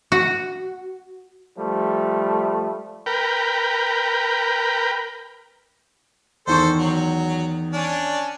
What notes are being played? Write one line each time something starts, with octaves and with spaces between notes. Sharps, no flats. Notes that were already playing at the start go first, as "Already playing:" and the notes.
F#4
F3 G3 A3
A#4 B4 G5
E2 D#3 A4 C5 C#6
F#3
C#4 D4